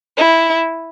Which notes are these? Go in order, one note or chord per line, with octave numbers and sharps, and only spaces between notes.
E4